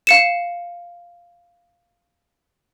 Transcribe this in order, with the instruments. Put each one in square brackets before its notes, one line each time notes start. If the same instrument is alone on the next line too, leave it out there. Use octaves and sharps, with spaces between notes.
[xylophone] F5 C#7 E7